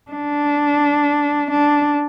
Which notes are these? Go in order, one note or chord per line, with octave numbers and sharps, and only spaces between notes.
D4
D4